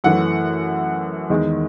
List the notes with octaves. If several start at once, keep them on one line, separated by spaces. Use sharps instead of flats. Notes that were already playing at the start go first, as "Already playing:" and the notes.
F#2 E3 A3 F#5
E2 D#3 G#3